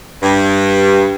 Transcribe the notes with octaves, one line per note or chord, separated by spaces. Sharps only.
G2